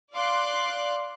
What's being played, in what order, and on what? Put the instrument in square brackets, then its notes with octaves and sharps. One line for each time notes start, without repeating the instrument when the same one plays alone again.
[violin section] D5 F5 C6 D6 F#6